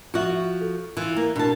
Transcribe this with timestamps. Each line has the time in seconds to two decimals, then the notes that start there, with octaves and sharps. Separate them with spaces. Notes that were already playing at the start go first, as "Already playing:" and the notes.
0.14 F3 F4 F#4 E5
0.61 A4
0.97 E3 F4
1.17 A#3
1.36 B2 D4 E4 A#4 A5